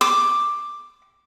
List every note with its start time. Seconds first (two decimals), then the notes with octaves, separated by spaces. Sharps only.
0.01 D6